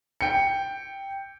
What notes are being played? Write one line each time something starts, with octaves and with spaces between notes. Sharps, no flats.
G5 C#7